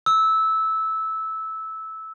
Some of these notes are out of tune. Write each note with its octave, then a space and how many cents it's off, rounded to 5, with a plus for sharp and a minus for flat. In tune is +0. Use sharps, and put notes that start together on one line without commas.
E6 -15